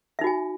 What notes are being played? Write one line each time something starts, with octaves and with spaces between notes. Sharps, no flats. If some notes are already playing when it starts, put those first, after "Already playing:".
D#4 F#4 E5 G#5